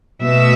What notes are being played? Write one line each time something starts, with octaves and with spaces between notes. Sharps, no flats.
B2 A3 E5